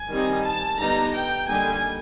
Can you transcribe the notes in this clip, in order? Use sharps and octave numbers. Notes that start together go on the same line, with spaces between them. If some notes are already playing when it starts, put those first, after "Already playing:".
Already playing: G#5
D#3 G3 C4 D#4
A5
D3 G3 B3 D#4 A#5
G5
D3 G3 A#3 D#4 G#5